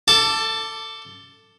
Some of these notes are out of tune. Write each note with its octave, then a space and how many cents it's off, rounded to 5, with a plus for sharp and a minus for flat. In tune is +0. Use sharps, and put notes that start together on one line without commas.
A4 +25 A5 +0 D6 +0